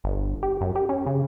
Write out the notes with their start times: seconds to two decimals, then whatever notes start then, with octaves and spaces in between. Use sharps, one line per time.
0.04 G1
0.43 G4
0.61 F#2
0.75 G4
0.89 C#4
1.06 C#3